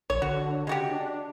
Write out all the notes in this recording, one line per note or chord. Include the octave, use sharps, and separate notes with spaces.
A#1 C#5
D3 F#4
C#3 G#3 F#4 G4
D4